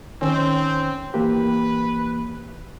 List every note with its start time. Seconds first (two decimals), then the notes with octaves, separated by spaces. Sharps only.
0.22 D#3 C4 C#4
1.14 E3 A#3 G4 B4